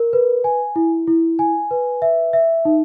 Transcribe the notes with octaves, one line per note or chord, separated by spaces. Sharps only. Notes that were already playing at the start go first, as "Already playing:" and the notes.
Already playing: A#4
B4
G#5
E4
E4
G#5
B4
E5
E5
D#4